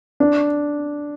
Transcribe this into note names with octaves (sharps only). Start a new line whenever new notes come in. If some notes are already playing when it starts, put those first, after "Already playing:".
D4